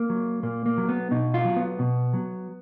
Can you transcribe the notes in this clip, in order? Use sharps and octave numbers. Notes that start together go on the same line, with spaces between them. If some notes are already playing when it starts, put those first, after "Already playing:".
Already playing: A#3
F#3
A#2 A#3
A#3
F#3
B3
B2 D#4
F4
F#3
B3
B2
F#3